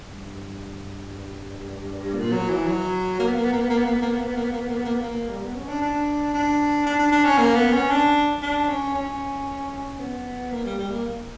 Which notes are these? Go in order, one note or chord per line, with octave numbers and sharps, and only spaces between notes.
G2
A#2
F#3
E3
F#3
A#3
B3
A#3
B3
A#3
B3
A#3
B3
A#3
B3
A#3
B3
A#3
B3
A#3
B3
A#3
B3
A#3
B3
A#3
B3
A#3
G3
B3
C#4
D4
D4
D4
D4
D4
D4
C#4
A#3
B3
C#4
D4
D4
C#4
C#4
B3
A#3
G3
G3
A#3